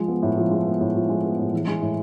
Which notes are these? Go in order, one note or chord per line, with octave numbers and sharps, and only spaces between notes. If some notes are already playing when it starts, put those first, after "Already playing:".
Already playing: F3 G#3
B3
A2
F3
G#3
B3
A2
F3
G#3
B3
A2
E3
G#3
A2